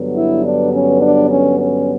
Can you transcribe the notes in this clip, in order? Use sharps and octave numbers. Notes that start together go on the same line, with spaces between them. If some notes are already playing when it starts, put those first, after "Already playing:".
Already playing: G2 D3 F#3 B3
E4
D4
C#4
D4
C#4
C#4